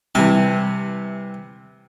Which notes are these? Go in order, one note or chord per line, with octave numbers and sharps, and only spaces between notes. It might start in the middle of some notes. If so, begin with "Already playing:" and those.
C3 E3 G3 G#5 A5